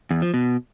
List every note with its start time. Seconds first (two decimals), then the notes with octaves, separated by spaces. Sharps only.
0.11 E2
0.22 F3
0.34 B2